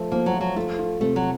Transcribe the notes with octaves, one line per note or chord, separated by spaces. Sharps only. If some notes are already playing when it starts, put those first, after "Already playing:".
Already playing: F3 A3
F3 A#3
F#3
F3
F#3
A3 F4
F4
C3 A3
F#3